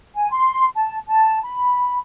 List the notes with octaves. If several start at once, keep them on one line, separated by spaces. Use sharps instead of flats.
G#5
C6
A5
A5
B5